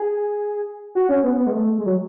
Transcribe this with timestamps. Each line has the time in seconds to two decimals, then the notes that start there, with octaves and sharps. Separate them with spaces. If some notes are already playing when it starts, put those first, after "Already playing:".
Already playing: G#4
0.95 F#4
1.09 C#4
1.23 B3
1.37 B3
1.47 G#3
1.52 A3
1.78 G#3
1.86 F#3